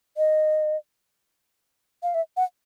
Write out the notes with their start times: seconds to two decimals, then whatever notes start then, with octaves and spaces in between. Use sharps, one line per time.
0.17 D#5
2.03 F5
2.14 E5
2.37 F#5